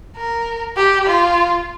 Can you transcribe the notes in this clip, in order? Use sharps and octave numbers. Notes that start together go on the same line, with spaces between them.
A#4
G4
F4